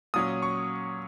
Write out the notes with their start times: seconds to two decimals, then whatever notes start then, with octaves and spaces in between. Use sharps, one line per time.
0.14 A#2 F#3 C#4 D#6
0.42 C#6